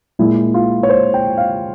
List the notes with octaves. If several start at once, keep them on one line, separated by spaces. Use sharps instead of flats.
A#2 G#3 E4
F4
C#5
C5
G5
F5